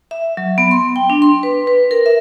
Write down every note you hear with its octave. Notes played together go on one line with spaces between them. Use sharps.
E5
F#3
B3
C6
G5
D4
C6
B4
B4
A#4
E5